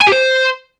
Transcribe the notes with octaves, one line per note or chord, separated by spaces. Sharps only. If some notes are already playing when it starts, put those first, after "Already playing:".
G#5
G4
C5